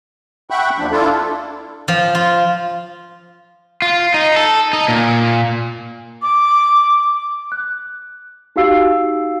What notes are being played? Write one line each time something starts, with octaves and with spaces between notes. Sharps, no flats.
E5 F#5 G5 B5 C#6 F#6
D#2 F3 D4
D4 E4 F4 A4
F3
F4
F4
D#4
A4
D#4
A#2
D6
F#6
D#4 F#4 G4 F5 E6 C7